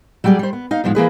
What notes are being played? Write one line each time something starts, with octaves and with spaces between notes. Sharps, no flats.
F#3 G3 G4 G#4 D5
G3 C5
B3
D#4 F5
E2 G#2 F3 G#3
E3 A#3 G#4 B4